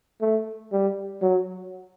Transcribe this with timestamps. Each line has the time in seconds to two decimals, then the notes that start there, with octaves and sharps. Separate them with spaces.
0.21 A3
0.72 G3
1.22 F#3